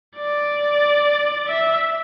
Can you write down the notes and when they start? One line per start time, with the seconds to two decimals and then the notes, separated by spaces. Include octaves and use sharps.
0.17 D5
1.48 E5